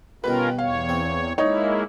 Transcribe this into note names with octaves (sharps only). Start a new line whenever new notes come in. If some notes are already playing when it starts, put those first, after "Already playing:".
G2 B2 D#3 C#4 F4 A#4 B4
E2 C#5 F5
C4
G#3 A#3 D#4 E4 C#5